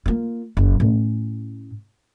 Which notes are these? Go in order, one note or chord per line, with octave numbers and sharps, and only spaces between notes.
A#3 F4
F#1
A2 C#4